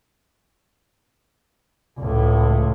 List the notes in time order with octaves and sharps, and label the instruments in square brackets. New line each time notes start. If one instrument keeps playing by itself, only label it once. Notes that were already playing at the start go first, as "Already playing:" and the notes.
[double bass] C#2 A2